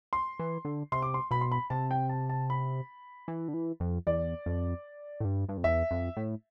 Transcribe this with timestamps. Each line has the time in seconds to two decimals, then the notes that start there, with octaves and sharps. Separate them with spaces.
0.13 C6
0.40 E3
0.65 D3
0.92 C3 C6
1.02 D6
1.14 C6
1.31 B2 B5
1.41 C6
1.52 B5
1.70 C3 A5
1.91 G5
2.09 A5
2.30 A5
2.50 B5
3.28 E3
3.48 D3
3.54 E3
3.80 F2
4.07 E2 D5
4.46 F2
5.20 A2
5.25 G2
5.49 G2
5.57 F2
5.64 E2 E5
5.91 F2
6.17 A2